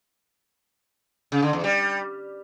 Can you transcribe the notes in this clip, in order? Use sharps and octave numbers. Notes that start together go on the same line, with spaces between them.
C#3
D3
E2
G3